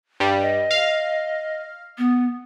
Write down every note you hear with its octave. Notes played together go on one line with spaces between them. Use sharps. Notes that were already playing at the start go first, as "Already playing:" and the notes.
G2 G3
D#5
F5
B3